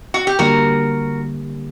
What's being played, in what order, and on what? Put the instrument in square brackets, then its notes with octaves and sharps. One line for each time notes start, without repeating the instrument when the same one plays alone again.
[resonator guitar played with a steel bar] F#4
G4
[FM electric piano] D3 G3 A#3 [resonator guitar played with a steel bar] F#4 A#4